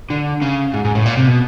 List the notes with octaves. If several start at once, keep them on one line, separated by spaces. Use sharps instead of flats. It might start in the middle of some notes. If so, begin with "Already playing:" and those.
D3
C#3
G#2
G#2
A2
A#2
C3
B2